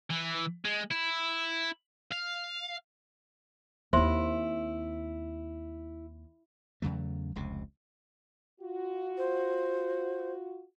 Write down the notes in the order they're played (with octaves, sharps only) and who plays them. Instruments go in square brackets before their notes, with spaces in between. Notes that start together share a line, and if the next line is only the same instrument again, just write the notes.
[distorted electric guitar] E3
G#3
E4
F5
[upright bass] D#2 C4 [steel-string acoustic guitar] E4 [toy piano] C5 E5 C6
[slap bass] E2 C#3 F#3 A3
F1 C#2 C3
[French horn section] F4 F#4
[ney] C5